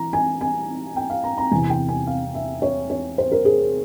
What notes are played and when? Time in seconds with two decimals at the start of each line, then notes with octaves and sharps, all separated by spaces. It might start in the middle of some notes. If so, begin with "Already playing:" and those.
Already playing: E3 A#5
0.13 G#5
0.41 G#5
0.96 G5
1.10 F5
1.24 A#5
1.38 A#5
1.52 E2 C3 E3 G#5
1.70 G5
1.88 G#5
2.07 F5
2.35 E5
2.62 C#5
2.90 C#5
3.18 C5
3.32 A#4
3.45 G#4